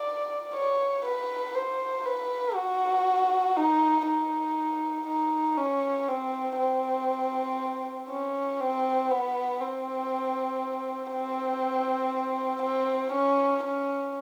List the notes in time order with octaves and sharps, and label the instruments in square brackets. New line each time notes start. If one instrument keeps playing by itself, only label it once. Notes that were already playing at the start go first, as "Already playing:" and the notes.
Already playing: [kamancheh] D5
C#5
B4
C5
B4
F#4
D#4
D#4
D#4
C#4
C4
C4
C#4
C4
B3
C4
C4
C4
C#4
C#4